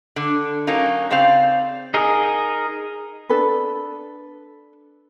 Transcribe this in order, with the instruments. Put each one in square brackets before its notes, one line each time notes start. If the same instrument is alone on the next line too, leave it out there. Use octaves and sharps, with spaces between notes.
[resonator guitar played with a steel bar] D3
F#3 A#3 C#4 D#4
C#3 C4 C5 D5 F5
[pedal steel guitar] D#4 G#4 A#4 D#5
[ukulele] D4 A4 B4